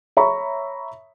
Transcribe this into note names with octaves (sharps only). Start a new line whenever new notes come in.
C#5 E5 A#5 B5 C#6